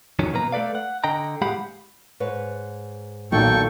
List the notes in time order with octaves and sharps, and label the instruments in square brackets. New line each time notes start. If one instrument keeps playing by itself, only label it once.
[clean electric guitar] F2 D#3 F#3 C#4
B2 A#3 B4 A#5
A3 A4 B4 D5 F5
F#5
D3 D#5 G5 A#5
A2 G#3 G4 F5 F#5 B5
[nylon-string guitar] G#2 B4 C#5
[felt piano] B1 [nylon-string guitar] E2 A#2 D#3 [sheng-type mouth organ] A4 G5 C#6